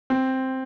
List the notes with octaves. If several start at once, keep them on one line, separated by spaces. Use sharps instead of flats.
C4